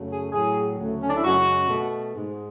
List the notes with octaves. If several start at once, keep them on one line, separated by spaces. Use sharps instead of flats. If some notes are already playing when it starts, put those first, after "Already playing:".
Already playing: F#2 C#3 F#3 A3
G#4
A2 F#3 A3 G#4
D2 C#3 F#3 A3
C#4
D4
E4
F#2 C#3 G#3 F#4
B2 A3
G#2 G#3